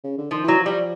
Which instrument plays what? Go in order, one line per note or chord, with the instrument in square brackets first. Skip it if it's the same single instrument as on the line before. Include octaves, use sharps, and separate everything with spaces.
[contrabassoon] C#3
D3
[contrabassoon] D#3 [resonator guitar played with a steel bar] F3
[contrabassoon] E3 [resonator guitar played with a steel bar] F#3
[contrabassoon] F3
[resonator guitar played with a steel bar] G3